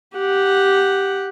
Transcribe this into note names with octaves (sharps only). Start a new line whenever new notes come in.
G4 F#5